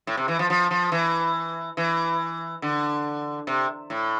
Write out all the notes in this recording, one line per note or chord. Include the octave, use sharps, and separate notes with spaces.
A2
C3
E3
F3
F3
F3
E3
E3
D3
C3
A2